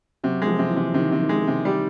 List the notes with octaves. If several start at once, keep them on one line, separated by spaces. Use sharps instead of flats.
C3 F#3
G#3
F3
C3
E3
C3
C3 D#3
C3
D#3
G#3
C3
G3